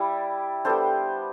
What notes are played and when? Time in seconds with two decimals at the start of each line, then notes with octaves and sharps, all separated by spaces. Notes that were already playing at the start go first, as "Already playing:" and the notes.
Already playing: G3 E4 D5
0.65 G3 B3 D4 A4 C5